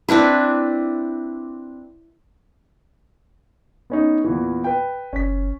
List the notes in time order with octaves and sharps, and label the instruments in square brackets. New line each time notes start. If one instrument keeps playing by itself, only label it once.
[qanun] C4 D4 E4 B4
[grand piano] B3 C#4 D#4
E2 A#2 E3
B4 G5
[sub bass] F#1 [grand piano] C#4 B6